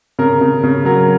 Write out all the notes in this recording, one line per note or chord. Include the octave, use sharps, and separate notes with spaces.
C#3 A#4
C#3
C#3
F#3 A#4